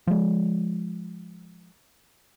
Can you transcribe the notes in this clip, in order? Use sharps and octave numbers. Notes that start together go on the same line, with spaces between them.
F3 G#3